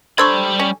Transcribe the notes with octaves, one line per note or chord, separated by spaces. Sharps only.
G3 D4 A4 C5 B5 C#6 E6 G#6
C#4